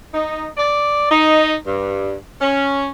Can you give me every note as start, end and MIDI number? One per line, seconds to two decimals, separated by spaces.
0.14 0.46 63
0.58 1.08 74
1.10 1.55 63
1.66 2.14 43
2.41 2.89 61